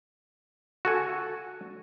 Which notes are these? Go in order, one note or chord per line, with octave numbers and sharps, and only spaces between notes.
F#4 A4 G#5